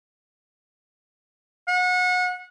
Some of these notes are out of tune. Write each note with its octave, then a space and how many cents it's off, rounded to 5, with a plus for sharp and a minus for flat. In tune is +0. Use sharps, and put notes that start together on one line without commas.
F#5 -30